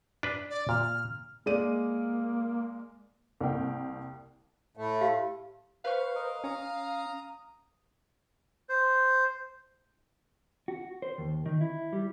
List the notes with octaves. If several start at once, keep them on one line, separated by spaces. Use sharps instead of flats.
D4 B4
D5
A#2 F6
G#3 A#3 D5 D#7
C2 A#3 G5
A2 A3
G4 F5
B4 C5 F5 C#6
A#4 D#5
C#4 A#5 D#6
C5
F#4
C5
D#2
D#3
E4
G3